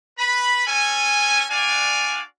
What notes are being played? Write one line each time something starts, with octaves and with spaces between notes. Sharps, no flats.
B4 B5
C#4 A4 G#5
D4 F#4 D5 F5 G#5